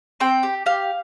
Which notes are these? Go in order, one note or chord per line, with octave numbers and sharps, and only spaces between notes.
C4 G5
G4
G4 F5